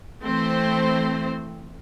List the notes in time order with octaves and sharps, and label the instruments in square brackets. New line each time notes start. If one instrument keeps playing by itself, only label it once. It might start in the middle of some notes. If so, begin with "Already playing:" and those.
[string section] E3 A3 C4 C5